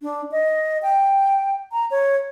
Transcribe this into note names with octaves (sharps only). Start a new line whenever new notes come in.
D4
D#5
G5
A#5
C#5